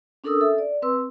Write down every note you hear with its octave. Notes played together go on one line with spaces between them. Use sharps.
C#4 D4 A4 A#4 D#6 E6
A4 E5
D5
C4 B4 C6 E6